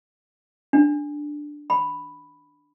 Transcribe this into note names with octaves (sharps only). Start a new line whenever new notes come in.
D4
B5